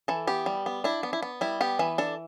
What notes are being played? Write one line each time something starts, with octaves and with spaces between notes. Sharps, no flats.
E3 A4
B3 G4
G3
B3
D4 E4
B3
E4
B3
G3 E4
B3 G4
E3 B4
D4 A4